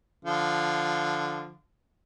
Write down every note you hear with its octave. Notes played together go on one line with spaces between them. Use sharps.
D3 F3